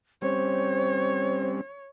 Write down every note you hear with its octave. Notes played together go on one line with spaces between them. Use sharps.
G3 C4 C#4 C5 C#5